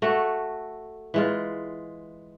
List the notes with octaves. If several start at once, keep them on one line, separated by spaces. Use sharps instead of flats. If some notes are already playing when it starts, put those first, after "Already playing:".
A3 F#4 A4
E3 G#3 F4